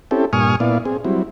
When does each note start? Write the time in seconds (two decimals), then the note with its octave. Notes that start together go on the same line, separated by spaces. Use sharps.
0.11 C4 C#4 E4 G4 A4
0.33 G2 A#2 G#5 C#6 D#6 F6
0.60 A#2 B3 E4 D5 F5
0.85 C4 G#4
1.05 F#3 G3 C4 E4